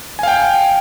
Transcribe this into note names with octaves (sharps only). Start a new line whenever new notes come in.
F5 G5 G#5